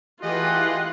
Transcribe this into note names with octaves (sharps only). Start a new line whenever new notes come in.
E3 A3 F4 G4 G#4 D#5 F#5